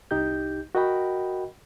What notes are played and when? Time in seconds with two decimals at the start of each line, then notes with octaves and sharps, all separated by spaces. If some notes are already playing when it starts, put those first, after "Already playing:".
0.11 C2 D#4 G4 G6
0.75 F#4 A#4 D#5 F#5 G5 B5